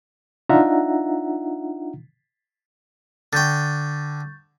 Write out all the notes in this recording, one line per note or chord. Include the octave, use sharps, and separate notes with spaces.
D4 D#4 F4 E5 F#5 A#5
D3 G5 C#6 G6 A6